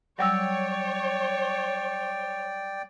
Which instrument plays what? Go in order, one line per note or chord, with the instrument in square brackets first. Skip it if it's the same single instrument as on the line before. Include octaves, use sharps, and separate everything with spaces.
[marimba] F#3 G3 E6 [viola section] C#5 [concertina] D5 G5